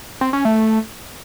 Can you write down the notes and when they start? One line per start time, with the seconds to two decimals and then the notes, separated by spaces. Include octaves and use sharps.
0.21 C4
0.33 C#4
0.45 A3